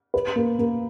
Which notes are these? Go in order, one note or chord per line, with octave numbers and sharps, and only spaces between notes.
B4
A#3
A#3